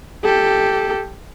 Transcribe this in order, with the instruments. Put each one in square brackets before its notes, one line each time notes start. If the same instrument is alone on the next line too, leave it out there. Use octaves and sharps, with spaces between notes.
[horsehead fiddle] G4 A4